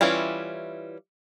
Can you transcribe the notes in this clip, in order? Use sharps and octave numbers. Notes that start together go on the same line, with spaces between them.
E3 G3 C#4 E4 F4